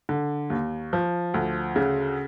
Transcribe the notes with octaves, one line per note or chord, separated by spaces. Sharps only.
D3
D#2
F3
D2
C#3